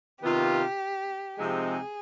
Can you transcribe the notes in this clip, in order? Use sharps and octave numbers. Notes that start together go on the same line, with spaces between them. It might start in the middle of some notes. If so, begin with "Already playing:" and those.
C3 D#3 B3 F4 G4
C3 F3 G#3 C4 D#4 G#4